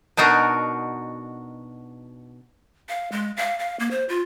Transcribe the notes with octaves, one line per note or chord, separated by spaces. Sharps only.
B2 D4 D#4 F#4 A#4
F5
G#3
F5
F5
A#3
C5
F4